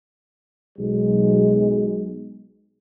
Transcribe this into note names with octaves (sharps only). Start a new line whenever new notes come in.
B1 G#3